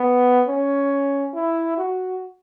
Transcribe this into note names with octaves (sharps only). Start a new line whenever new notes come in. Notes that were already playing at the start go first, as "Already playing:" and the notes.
Already playing: B3
C#4
E4
F#4